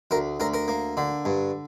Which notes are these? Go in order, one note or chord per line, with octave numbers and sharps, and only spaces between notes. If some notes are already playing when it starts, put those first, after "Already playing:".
D2 A#4
D2 A#4
A#4
A#3
D3
G2